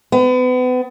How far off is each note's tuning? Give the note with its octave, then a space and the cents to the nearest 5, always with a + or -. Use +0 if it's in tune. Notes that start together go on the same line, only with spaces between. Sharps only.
B3 +35